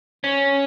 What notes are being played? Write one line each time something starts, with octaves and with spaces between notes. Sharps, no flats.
C#4